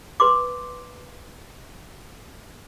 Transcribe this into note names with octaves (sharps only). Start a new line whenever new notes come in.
B4 C6 D6